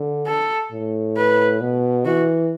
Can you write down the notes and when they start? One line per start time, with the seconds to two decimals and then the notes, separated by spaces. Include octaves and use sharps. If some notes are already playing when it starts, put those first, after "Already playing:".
Already playing: D3
0.27 A4
0.72 A2
1.17 B4
1.61 B2
2.05 E3 F#4